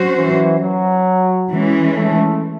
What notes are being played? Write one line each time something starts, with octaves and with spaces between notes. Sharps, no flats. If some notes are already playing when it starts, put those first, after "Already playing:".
Already playing: F#3 C#4 F#4 C5
E3
F#3
E3 G#3 C#4
A3